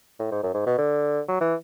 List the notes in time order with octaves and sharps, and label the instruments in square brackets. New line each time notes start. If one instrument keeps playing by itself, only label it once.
[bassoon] A2
G#2
F#2
G#2
B2
D3
F#3
E3